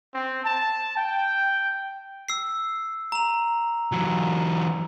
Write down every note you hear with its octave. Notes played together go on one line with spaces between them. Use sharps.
C4
A5
G5
E6 C7
A#5 F7
E3 F#3